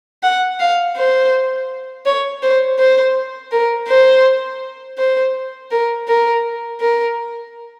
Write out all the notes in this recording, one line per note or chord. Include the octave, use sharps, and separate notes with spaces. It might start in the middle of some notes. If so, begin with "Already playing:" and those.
F#5
F5
C5
C#5
C5
C5
A#4
C5
C5
A#4
A#4
A#4